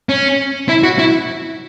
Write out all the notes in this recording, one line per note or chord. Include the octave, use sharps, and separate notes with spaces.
C#4
E4
F#4
E4